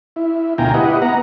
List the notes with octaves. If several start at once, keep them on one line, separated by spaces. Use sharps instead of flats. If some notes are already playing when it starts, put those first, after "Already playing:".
E4
D2 B2 F4 G5 G#5 A#5
E4 G4 B4 D#5 F#5
B3 F#5 A#5